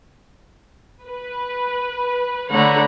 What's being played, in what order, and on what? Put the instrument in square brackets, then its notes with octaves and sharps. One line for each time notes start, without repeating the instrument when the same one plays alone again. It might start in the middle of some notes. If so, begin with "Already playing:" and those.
[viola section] B4
D3 A3 C#5 F#5 A#5 B5